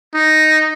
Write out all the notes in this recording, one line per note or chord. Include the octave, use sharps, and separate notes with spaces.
D#4